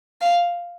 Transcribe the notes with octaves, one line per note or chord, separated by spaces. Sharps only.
F5